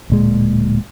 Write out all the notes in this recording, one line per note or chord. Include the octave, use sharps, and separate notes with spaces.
D1 A#2 G#3